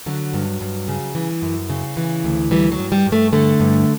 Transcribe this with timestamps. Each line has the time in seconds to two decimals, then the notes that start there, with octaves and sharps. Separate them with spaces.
0.06 D3 F#3
0.34 G2
0.61 G2
0.88 C#3
1.15 E3
1.42 F#2
1.70 C#3
1.97 E3
2.24 D2
2.51 E3 G3
2.72 F#3
2.79 G2
2.92 G3
3.06 G2
3.12 A3
3.33 D3 A3
3.60 G2